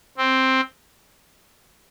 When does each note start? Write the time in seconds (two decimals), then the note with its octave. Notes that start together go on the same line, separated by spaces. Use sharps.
0.17 C4